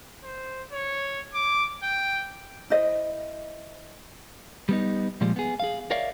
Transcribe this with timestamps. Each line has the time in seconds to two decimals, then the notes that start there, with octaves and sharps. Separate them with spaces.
0.24 C5
0.72 C#5
1.34 D6
1.83 G5
2.70 E4 C5 D#5
4.69 G3 B3 D#4
5.21 A#2 F3 G3 G#3
5.36 B3 G#4
5.60 G#4 F5
5.91 A#4 C#5 D5 E5 F5